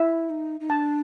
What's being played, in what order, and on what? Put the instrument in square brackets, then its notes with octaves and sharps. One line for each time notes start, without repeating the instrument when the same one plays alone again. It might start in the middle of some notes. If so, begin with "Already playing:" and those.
Already playing: [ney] E4 [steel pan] E5
[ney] D#4
D#4
[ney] D4 [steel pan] A5